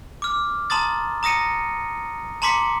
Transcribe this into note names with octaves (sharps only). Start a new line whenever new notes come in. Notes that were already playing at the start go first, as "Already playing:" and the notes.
D6 F6
A5 A#5 C6 D#6 A6
A#5 D#6 A#6 C#7 D#7
A5 A#5 C6 D6 B6 C#7